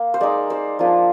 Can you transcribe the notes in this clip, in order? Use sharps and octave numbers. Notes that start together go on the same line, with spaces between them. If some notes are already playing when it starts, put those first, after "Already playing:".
Already playing: A#3
C5
G#3 D#4 D5
C5
F3 A#3 D4 F4